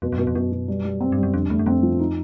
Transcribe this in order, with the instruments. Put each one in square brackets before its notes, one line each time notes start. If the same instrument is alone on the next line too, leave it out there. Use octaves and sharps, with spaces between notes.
[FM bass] F2 [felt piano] B2
[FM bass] F2
[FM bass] F#2 [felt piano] B2
[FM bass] F2
[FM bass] F#2 [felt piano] B2
[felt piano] B2
G3
G3
C4
[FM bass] G2
[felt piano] G3
[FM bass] F#2
[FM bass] F2 [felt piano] D3
[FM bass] E2 [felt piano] A3
[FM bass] F#2
[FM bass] F2 [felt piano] C4
[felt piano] F3
D#4